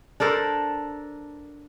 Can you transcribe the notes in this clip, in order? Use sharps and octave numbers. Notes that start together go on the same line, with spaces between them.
D4 A4 A#4 C5